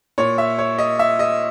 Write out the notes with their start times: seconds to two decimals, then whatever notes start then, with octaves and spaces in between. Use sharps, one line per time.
0.18 A#2 C#5
0.38 E5
0.58 C#5
0.78 D#5
0.99 E5
1.19 D#5